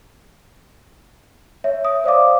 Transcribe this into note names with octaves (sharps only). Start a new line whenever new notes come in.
C#5 E5
D#6
C5 D5 F5 D6